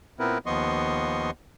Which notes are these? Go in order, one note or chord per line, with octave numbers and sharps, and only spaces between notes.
A#2 B3 C4 E4 A#4 B4
D#2 F3 B3 D#5 C6 C#6